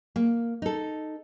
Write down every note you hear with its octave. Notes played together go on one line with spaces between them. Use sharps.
A#3
D#4 A4